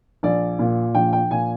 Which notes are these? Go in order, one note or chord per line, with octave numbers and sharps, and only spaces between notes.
A#1 D5
A#2
A#1 G5
G5
A#2 G#5